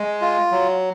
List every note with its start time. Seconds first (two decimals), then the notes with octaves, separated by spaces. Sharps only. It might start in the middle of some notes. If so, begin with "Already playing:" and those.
Already playing: G#3
0.21 F4
0.51 F#3